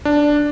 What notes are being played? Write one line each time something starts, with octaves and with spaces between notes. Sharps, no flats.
D4